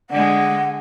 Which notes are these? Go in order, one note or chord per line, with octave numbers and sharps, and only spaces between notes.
D3 G#3 F#5